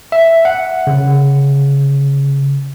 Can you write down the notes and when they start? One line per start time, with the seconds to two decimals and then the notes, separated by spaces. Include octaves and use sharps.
0.12 E5
0.45 F#5
0.87 C#3